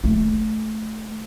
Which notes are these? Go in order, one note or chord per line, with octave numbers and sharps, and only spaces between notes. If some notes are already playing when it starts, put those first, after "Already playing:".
A3